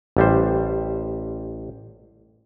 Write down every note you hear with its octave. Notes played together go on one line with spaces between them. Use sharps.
A1 G3 C5